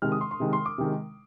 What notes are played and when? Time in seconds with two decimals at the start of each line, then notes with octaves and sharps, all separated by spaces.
0.02 C3 D#3 G#3 F6
0.12 D#6
0.21 C6
0.31 C6
0.40 C3 D#3 G#3
0.53 C6
0.66 D6
0.78 C3 D#3 G#3